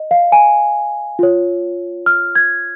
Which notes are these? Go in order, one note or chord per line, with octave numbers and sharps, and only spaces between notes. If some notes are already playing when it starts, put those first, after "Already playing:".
Already playing: D#5
F5
G#5
F4 C#5
F6
G#6